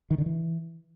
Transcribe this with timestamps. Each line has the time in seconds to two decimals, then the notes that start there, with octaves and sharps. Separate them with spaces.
0.11 D#3
0.18 D3
0.26 E3